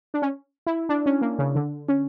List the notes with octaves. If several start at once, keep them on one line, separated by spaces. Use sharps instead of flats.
D4
C#4
E4
D4
C#4
A#3
C#3
D3
C#4